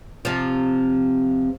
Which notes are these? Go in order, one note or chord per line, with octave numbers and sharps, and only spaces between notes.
C3 F3